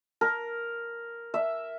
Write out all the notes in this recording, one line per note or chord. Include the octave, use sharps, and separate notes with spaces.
A#4
E5